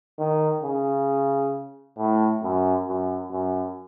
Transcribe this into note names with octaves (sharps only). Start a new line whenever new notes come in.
D#3
C#3
A2
F#2
F#2
F#2